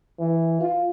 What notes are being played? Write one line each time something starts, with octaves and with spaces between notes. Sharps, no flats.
E3
F4